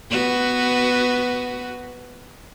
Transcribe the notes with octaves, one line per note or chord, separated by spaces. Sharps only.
B3 F#4 B4